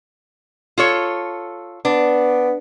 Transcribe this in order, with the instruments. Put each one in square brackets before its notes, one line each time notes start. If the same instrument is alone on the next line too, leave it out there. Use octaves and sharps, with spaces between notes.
[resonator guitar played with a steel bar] F4 A4 C#5
[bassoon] B3 [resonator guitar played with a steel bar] D4